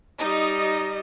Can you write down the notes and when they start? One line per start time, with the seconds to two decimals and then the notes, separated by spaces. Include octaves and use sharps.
0.20 G3 D#4 D#5